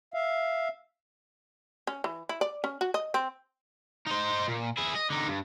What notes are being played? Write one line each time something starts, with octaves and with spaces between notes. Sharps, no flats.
E5 F5
C#4
E3
E4
D5
C#4
F#4
D#5
C4
D#4 C5
A#2
E4 G#4
D#5
D3 D#4
G2